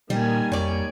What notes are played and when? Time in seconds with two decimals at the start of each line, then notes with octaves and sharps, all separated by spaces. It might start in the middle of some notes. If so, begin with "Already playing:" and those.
0.10 A#2 D#3 G3 A#3 G#5
0.52 F2 C#5 D5